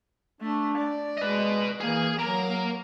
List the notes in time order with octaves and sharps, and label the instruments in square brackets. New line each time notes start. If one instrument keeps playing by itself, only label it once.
[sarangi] A3 [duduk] D4
[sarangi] D5
[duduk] G#3 [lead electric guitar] B4 D#5
[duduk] E3 [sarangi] A#3 [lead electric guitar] G#4
[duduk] F#3 [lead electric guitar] A#3 A#4 [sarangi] A#5